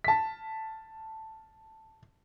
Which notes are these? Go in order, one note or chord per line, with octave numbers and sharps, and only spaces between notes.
A5 B6